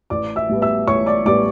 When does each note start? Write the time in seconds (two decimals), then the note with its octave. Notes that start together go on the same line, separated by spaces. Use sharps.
0.10 A1 D5 D6
0.36 E5 E6
0.49 A2 G3 B3
0.62 E5 E6
0.87 A1 C#5 C#6
1.06 D5 D6
1.25 A2 G3 B3 D5 D6